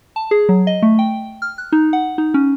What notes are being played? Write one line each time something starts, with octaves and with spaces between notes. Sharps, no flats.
A5
G#4
F#3
D#5
A3
G5
F6
F#6
D#4
F#5
D#4
C#4